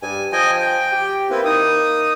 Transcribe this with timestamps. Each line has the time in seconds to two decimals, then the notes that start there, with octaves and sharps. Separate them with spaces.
0.02 G2 G#5
0.32 F3 D#5 G5 G#5
0.60 G5
0.92 G4
1.30 A#3 C4 E4 B4
1.45 D#4 D#6